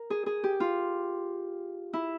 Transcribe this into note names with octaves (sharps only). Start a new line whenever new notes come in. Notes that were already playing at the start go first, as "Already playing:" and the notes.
Already playing: A#4
G#4
G#4
G4
F4
E4